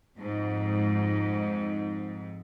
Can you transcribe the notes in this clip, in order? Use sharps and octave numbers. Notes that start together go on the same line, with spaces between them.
F2 G#2